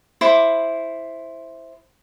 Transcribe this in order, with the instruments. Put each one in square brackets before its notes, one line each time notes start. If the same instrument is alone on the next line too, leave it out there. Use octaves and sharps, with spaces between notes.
[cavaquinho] E4 C5 B5 D6